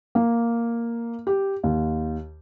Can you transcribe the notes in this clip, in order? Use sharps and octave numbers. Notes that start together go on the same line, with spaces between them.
A#3
G4
D#2